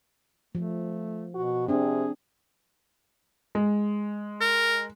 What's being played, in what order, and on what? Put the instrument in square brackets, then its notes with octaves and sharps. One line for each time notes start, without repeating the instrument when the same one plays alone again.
[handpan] F3 [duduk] A3
[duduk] B2 [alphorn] F#4
[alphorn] C3 [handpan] C4 D4 [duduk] G#4
[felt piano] G#3
[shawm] A#4